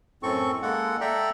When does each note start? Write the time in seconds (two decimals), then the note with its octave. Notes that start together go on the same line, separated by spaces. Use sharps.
0.23 F#2 A2 C4 A4 C#6
0.62 G#3 A#3 A4 F#5
1.01 A4 D5 E5 G5 A#5